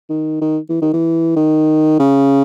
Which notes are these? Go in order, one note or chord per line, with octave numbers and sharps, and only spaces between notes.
D#3
D#3
E3
D#3
E3
D#3
C#3